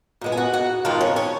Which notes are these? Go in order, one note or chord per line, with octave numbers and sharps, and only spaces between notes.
A#2 G#3 B3
G#5
F#4 F#5
F#4 F#5
F2 D#3 G#3 F4 F5
C#4 C#5
C#4 C#5